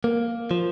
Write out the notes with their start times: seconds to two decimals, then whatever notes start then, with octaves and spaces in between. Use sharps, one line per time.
0.04 A#3
0.51 F3